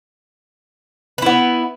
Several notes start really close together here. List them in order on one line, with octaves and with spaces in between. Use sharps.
B4 E4 B3